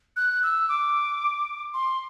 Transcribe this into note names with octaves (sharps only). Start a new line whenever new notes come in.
F#6
E6
D6
C6